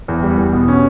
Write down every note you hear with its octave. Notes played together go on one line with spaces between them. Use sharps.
E2
G3
E2
B2
C#4